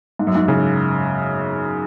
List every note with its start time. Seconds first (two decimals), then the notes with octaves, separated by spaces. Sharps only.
0.19 G#2
0.27 F#2
0.35 G#2
0.48 C#3